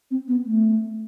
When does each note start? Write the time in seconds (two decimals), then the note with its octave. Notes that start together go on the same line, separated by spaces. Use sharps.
0.11 C4
0.28 B3
0.45 A3